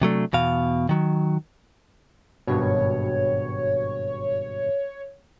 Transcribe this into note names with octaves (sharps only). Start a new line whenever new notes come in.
C3 F#3 A3 D4
E2 B2 F5
D#3 F#3
G#1 G2 B2 C#5